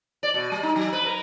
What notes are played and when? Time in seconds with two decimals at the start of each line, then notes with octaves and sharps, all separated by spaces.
0.23 D5
0.34 B2
0.52 G3
0.63 D#4
0.76 F#3
0.93 B4
1.06 A#4